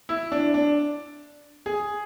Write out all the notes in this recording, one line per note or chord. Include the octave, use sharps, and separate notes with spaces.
E4
D4
D4
G#4